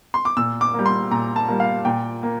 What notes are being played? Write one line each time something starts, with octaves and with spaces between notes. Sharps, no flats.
C6
D6
A#2 E6
D6
G3 A#3
C6
A#2 A#5
A5
G3 A#3
F5
A#2 G5
A#3